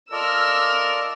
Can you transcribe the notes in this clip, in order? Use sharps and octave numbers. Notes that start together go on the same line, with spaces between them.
F4 A4 A#4 D5 D#5 E6 F6